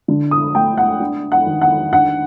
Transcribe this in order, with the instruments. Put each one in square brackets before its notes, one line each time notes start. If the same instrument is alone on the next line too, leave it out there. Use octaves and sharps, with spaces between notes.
[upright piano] D3
D#6
A3 G5
F#5
D4
F#5
D#3
F#5
D4 F#5